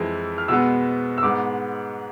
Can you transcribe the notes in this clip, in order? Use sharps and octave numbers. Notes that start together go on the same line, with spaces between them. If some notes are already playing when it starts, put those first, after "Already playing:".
Already playing: F2 E3 G#3
F6
B2 G#3 B3 E6
E6
G#2 G#3 B3 D6